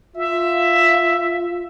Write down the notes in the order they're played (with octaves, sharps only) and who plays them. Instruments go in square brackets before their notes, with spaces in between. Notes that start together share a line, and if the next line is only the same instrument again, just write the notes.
[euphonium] F4 [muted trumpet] E5